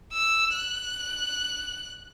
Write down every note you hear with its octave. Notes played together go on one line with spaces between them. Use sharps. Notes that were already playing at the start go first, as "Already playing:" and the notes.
E6
F#6